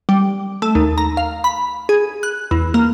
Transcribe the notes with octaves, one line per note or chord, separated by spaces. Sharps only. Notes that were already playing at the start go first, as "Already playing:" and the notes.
G3
A3
D#2
A#5
F5
B5
G#4
F#6
E2
A#3